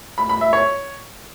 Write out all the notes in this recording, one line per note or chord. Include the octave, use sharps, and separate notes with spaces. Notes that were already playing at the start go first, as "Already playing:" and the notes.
B5
B5
E5
C#5